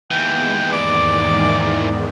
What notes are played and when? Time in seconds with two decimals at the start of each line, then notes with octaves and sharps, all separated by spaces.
0.11 D#2 E3 G#3 B3 G5
0.73 E2 G#2 D#3 D5 D6